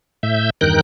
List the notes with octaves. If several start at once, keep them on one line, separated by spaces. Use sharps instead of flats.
A2 E5 G6
E2 G2 D#3 A#4 F#6 G6